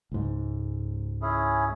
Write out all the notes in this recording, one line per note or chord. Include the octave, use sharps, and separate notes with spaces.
C#2 G#2
C#4 E4 G#4